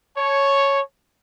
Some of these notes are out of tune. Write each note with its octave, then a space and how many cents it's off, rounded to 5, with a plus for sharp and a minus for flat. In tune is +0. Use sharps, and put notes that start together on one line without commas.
C#5 +0 A5 -25